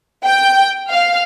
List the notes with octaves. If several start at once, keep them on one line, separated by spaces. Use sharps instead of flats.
G5
F5